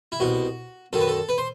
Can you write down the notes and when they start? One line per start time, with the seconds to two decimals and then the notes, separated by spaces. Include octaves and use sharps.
0.12 E4
0.20 C2 B2 F#4
0.93 F#2 D#3 A4
1.01 B4
1.08 A4
1.29 B4
1.38 C5